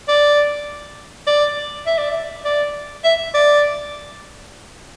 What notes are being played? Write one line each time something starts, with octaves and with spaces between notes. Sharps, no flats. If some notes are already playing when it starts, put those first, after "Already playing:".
D5
D5
E5
D5
E5
D5
E5
D5